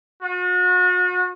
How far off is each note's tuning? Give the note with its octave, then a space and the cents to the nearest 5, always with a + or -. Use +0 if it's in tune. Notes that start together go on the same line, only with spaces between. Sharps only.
F#4 -40